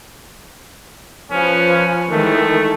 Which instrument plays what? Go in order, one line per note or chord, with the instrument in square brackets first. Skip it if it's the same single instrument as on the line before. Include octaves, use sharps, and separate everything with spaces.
[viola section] F3 B4 [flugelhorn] C#4
[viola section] D#3 E3 G#3 [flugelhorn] A3